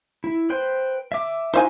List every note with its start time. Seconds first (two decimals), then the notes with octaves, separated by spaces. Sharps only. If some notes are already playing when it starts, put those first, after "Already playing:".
0.24 E4
0.50 B4 C5 G5
1.12 E5 D6
1.54 D#4 E4 F#4 C5 E5 G#5